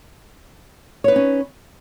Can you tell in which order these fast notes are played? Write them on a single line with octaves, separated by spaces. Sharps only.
C#5 B4 D#4 C#4